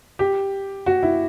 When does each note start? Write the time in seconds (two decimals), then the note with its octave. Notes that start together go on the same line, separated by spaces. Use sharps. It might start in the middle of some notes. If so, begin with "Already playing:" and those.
0.19 G4
0.86 F#4
1.03 E4